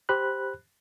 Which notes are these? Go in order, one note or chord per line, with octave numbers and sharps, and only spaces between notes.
G4 C5 B5 F#6